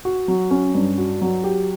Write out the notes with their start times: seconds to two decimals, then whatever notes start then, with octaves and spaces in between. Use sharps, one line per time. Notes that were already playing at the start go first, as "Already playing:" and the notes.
0.05 F#4
0.28 F#3
0.51 C#4
0.75 G2
0.98 F#4
1.21 F#3
1.44 G4